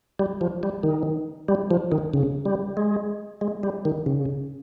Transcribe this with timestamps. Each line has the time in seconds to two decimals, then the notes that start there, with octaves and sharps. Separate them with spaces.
0.19 G3
0.41 F3
0.63 G3
0.83 D#3
1.48 G3
1.71 F3
1.92 D#3
2.14 C#3
2.45 G3
2.77 G#3
3.41 G#3
3.63 G3
3.85 D#3
4.06 C#3